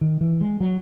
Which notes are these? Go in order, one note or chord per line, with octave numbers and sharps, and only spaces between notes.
D#3
E3
G#3
F#3